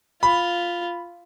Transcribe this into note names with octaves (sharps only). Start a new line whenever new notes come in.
F4 B5